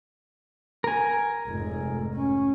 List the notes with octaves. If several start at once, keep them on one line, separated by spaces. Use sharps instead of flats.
A#4 G#5
F1 G#2
C#4